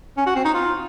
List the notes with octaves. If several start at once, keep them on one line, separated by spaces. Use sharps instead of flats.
C#4
F#4
C4
D#4
F4